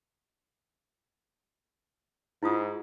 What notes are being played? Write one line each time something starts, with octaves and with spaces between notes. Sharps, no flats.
G#2 E4 F4 D#6